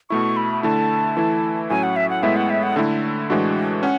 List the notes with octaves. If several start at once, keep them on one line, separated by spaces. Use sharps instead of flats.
B2 A3 E4 C#6
B5
D3 A3 E4 A5
E3 A3 E4
A2 F#3 C#4 G#5
F#5
E5
F#5
A2 G#3 B3 E4 E5
F#5
E5
F#5
D3 A3 E4
A2 E3 G#3 D4 F#4
C#4 F#5